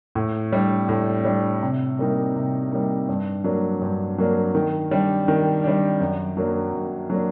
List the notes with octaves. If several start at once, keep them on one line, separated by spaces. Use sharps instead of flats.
A2
G3 D4
A2
G3 D4
C3
G3 A#3 D#4
C3
G3 A#3 D#4
G2
F#3 A#3 D4
G2
F#3 A#3 D4
D#3
G3 D4
D#3
G3 D4
F#2
F#3 A#3 D4
F#2
F#3 A#3 D4